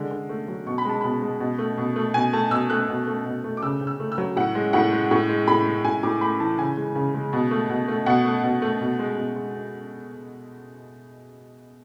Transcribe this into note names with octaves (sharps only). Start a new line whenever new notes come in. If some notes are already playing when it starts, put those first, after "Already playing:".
Already playing: D3 G#3
D3
A3
F#3
B2 C#6
B5
G#3 A5
B2 B5
G#3
B2
A3
B2
A3
B2 G#5
A3 A5
B2 E6
A3 F#6
B2
A3
B2
A3
D6
C#3 E6
C#3
E6
A3
E6
F#3
A2 F#5
G#3
A2 F#5
G#3
A2 C#6
G#3
A2 B5
G#3
A2 G#5
A2 D6
A3 B5
E3 A5
C#3 G#5
G#3
C#3
G#3
B2
A3
B2
A3
B2 F#5
A3
B2
A3
B2
G#3
B2
G#3